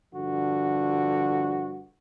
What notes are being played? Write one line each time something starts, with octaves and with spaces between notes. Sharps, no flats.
G2 D3 F3 F#4